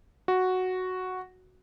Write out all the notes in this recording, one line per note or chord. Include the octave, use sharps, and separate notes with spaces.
F#4